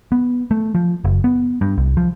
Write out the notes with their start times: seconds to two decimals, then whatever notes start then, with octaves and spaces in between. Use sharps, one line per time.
0.12 B3
0.51 A3
0.75 F3
1.04 F#1
1.24 B3
1.61 G2
1.78 C2
1.97 F3